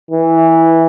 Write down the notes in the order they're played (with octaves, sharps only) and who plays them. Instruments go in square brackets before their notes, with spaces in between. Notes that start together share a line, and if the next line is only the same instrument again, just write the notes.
[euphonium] E3